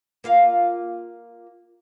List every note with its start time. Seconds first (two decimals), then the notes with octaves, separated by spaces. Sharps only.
0.24 A#3 F4 F5